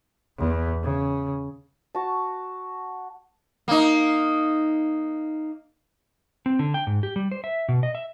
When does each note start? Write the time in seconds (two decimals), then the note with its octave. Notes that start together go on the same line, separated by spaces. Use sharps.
0.38 E2
0.83 C#3
1.95 F#4 A5
3.68 A#3 D#4
6.46 C4
6.59 D3
6.74 G5
6.87 G#2
7.03 G4
7.16 G3
7.32 C5
7.44 E5
7.69 B2
7.83 D#5
7.95 E5